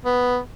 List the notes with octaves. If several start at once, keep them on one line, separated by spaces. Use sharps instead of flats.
B3